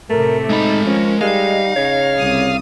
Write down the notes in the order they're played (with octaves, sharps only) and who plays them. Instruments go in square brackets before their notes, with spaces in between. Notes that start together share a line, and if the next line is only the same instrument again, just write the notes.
[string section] A2 C3 [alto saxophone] A3 [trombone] A#4
[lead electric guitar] G#3 B5 [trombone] D#4
[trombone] F3 [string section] C#4 A#4
[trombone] G3 [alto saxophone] G#3 [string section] D#4 [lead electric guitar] F5
[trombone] C#3 [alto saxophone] C#5
[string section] C2 D#6